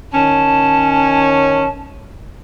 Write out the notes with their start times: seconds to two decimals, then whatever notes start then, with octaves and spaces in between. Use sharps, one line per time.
0.13 D#3 C#4 A5